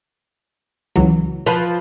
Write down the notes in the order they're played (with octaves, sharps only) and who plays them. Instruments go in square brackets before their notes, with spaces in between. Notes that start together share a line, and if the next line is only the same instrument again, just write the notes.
[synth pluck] C#2 E3 F#3
[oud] F3 B4